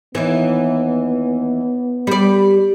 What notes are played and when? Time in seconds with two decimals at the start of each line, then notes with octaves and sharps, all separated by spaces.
0.15 D#2 E3 B3
2.07 G3 D5